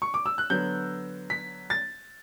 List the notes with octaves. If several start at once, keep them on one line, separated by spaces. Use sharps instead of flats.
C#6
D6
E6
F#6
D3 F#3 B3 G6
B6
A6